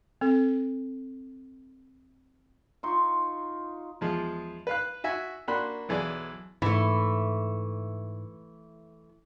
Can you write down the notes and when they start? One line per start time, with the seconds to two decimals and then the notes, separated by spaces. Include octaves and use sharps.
0.21 C4 A4
2.83 D#4 F4 C6 C#6
4.01 E2 F3 G#3
4.67 B4 F5 F#6
5.04 F#4 E5 G#5
5.48 A#3 D4 F#4 B5 C6 F#6
5.89 B1 E3 G#4 D5
6.62 G#2 E3 A3